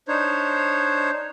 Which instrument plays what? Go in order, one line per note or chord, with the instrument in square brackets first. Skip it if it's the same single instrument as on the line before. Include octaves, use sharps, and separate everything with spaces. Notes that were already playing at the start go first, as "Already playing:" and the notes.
[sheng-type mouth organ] D4 D#4 C5 C#5